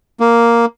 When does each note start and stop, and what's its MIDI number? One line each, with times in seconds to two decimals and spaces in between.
0.20 0.65 58